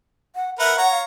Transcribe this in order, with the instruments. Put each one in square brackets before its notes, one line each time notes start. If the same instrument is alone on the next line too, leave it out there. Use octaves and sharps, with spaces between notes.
[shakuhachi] F#5
[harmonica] A#4 B4 F#5 [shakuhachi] E5
[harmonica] C#5 A#5 [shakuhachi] F#5
[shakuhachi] F5